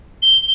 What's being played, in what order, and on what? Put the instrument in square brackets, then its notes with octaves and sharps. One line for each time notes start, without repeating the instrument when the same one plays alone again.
[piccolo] G7